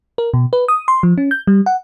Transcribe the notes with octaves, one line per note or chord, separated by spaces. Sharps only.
A#4
B2
B4
D#6
C6
F3
C#4
G6
G3
F#5